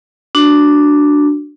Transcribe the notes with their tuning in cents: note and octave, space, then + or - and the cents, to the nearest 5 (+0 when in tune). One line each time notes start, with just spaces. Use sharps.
D4 +0 F#4 +0